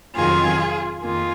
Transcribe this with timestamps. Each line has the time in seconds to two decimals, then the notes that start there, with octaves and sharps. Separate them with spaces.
0.15 F2 C3 D#3 F#3 C4 F4 G#4
1.01 F2 D#3 A#3 F4 G#4